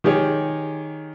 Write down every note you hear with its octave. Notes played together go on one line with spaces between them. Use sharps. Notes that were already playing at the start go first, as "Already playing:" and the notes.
D#3 G4 G#4 C#5